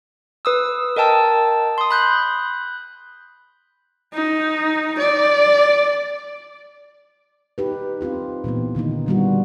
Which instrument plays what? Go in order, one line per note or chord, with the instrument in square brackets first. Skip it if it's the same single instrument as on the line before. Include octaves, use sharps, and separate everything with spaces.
[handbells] B4 D#6 E6
A#4 D#5 G5 A5 E6
C6 D#6
B5 F#6 G6
[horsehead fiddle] D#4
D5
[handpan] D#4 G4 B4
C4 D#4 F4 G4
A#2 E3 A#3 B3
D3 D#3 A#3 D#4
D#3 F3 G3 B3 F4 F#4